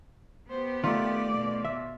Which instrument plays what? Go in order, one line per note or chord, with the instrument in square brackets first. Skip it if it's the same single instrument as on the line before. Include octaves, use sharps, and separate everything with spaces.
[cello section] B3 G4 [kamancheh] C5
[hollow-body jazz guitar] D#3 A3 [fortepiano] F4 [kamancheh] D5
[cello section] B2
[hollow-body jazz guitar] E5